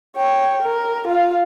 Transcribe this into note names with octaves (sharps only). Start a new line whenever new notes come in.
C#5 G5
A#4
F4 F5